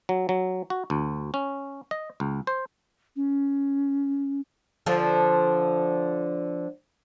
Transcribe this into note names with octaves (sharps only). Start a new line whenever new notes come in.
F#3
F#3
F#4
D2
C#4
D#5
C#2
C5
C#4
D3 F3